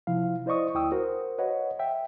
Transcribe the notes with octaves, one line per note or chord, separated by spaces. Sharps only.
C3 F3 E4 F5
E4 C5 D5 D#5 C#6 D#6
D2 E4 G5 D#6 E6
F#4 A#4 C5
B4 C#5 D#5 F#5
E5 G5